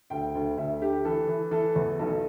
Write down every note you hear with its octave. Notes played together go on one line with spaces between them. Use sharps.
D2 G5
D2
D2 E5
D3 G4
E3 A4
E3
E3 A4
E2
B1 A4